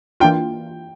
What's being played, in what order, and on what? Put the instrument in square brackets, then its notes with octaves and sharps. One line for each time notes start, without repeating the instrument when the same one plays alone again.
[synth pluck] E3 A#3 D4 F4 [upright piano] G5